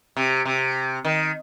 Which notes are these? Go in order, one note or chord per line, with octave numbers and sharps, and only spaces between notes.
C3
C3
D#3